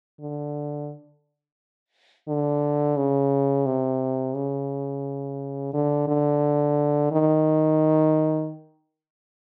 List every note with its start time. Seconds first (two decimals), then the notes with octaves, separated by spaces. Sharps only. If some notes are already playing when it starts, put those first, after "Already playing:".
0.20 D3
2.28 D3
2.97 C#3
3.66 C3
4.35 C#3
5.73 D3
6.08 D3
7.12 D#3